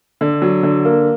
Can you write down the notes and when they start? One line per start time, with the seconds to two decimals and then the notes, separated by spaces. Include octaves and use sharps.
0.21 D3
0.42 F#3
0.63 D3
0.85 A#3